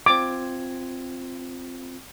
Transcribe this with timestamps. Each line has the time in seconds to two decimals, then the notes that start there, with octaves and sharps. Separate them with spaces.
0.06 C4 F4 D6 G#6